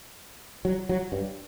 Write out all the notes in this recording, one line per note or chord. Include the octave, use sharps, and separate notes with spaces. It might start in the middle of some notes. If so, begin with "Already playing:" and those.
F#3
F#3
G2